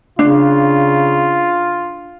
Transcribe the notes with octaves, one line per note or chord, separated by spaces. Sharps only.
C#3 D4 F4